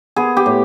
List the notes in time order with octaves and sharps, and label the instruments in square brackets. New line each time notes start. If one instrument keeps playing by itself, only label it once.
[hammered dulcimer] B3 G#4
G4
A2